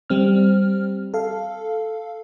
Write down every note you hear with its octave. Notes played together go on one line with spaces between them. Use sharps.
G3 C4 F6
A4 F5